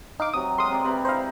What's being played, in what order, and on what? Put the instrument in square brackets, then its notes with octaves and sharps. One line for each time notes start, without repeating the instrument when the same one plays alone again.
[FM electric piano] D#4 F5 D6
[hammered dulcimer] C3 F#3 [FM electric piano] D#6
[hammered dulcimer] G#3 A#4 [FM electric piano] C6 D#6
[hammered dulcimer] C4 G#4 D5
C3 B4 F5
[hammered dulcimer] D#4 E4 [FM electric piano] C5 F5